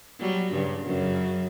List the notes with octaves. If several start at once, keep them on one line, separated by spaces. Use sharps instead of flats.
F#3 G3
G2 C#3
F#2 C#3